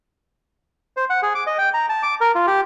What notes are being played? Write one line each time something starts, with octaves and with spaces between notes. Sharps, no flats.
C5
F#5
G#4
D6
D#5
G5
A#5
A5
D6
A#4
F4
G4